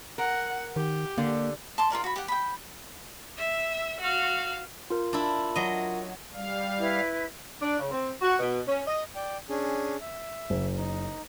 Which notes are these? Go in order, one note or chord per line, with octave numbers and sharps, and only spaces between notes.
A#4 F#5
D#3 G4
D3 A#3
A5 C6 D6
F4 F#4 A#4 D5
F#4 B5
G4 F#5
G5 B5
E5
F#4 F5
F4 A#4
D4 E4
F#3 D#5
G3 F5
E4 B4
D4
C#3
C4
F#4
B2
C#4
D#5
D5 G5
C#4 D4 G#4
E5
F#1
D#4